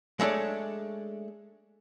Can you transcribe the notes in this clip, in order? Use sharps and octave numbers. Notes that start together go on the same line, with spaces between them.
G#3 A3 D4 C#5